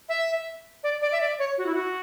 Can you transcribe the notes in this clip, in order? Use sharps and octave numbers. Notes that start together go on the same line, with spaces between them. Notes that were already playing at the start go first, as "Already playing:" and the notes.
E5
D5
D5
E5
D5
C#5
F#4
E4
F#4